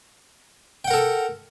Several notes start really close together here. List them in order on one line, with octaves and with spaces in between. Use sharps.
G5 F#5 A#4 A4